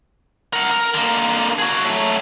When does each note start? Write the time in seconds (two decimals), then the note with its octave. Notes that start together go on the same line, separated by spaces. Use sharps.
0.53 A#4 F#5
0.71 A#4
0.94 D3 A#3
1.59 F#4 G#4
1.85 F#3 A3